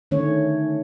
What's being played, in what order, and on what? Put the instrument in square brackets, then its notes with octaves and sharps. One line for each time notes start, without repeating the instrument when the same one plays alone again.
[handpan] D3 D#3 A3 C#4 C#5